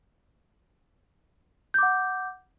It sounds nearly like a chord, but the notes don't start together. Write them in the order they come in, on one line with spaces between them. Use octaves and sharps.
G6 D6 F#5